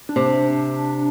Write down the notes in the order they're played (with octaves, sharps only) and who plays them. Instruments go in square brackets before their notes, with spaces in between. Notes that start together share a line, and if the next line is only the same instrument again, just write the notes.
[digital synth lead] D4
[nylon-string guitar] C3